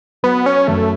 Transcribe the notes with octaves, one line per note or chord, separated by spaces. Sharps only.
F#3 B3
C#4
F#2 A3